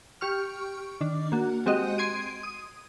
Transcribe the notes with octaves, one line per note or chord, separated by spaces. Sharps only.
G4 C#6 F6
D#3 D4
A#3 F#4
G#3 C4 F#4 G4 D#5
C6 G#6 D7 D#7
D#6